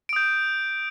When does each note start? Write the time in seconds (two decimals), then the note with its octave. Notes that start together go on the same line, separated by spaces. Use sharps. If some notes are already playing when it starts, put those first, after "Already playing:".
0.09 D7
0.13 D#6
0.16 G6